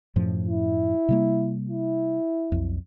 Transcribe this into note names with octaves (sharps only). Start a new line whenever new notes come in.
F#2 A2 F3
E4
C3 G3 A#3
E4
B1 F2